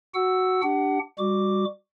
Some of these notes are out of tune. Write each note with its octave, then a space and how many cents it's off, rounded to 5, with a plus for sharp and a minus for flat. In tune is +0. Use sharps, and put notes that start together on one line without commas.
F#4 +0 F#5 +10 E6 +0
D4 +0 G4 +0 F#5 +25
G3 +25 F#4 +0 D6 +0